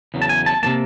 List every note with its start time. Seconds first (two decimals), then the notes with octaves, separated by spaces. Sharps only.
0.14 E2 C#3 F#3
0.22 A5
0.29 G#5
0.46 A5
0.63 C3 F3 A#3 A5